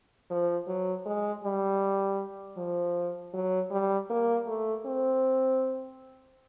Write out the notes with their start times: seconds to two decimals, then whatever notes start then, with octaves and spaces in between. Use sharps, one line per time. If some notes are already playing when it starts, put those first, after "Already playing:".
0.30 F3
0.68 F#3
1.06 G#3
1.44 G3
2.57 F3
3.34 F#3
3.71 G3
4.10 A#3
4.47 A3
4.86 C4